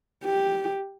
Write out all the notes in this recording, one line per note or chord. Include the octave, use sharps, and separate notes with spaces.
G4